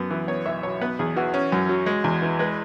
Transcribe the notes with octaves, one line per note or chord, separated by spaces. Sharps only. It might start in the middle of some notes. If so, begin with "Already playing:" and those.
Already playing: F#2 B3
E3
B3 C#5
B1 E5
B2 C#5
B3 B4
E2 G#4
E3 F#4
C#4
F#2
F#3
G#3
E2
E3
G#3 B4